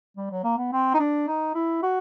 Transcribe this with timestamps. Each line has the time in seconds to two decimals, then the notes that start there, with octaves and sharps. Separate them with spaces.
0.17 G3
0.31 F#3
0.44 A#3
0.58 B3
0.73 C4
0.94 D#4
1.00 D4
1.28 D#4
1.55 E4
1.83 F#4